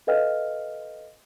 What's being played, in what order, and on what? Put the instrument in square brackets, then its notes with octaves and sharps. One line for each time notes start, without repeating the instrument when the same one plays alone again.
[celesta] A4 B4 D#5 F5 G5 F6